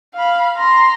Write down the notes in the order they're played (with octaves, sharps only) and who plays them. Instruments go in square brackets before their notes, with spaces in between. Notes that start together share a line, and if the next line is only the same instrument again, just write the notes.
[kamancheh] F5 B5
A#5 C6